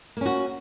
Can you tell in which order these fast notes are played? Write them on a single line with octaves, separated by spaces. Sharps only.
A#3 C#4 F#4